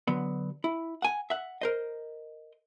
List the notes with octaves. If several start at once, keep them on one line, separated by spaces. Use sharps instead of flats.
D3 F#3 B3
E4
F#5 G#5
E5 F#5
A#4 C5 D#5